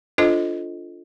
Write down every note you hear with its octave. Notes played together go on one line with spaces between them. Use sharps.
D4 F4 A4 C5 D#5